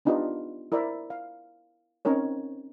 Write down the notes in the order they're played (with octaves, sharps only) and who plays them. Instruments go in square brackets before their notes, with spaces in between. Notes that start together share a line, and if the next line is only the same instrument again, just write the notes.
[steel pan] B3 D4 D#4 F4 G4 B4
E4 A#4 C5 D5 E5
F5
C4 C#4 D#4 A#4 C#5